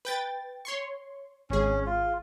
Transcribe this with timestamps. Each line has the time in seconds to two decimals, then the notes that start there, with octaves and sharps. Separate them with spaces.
0.05 B4 G5 A6
0.65 C#5 C6 C#6
1.50 G#1 C#4 G#4
1.86 F4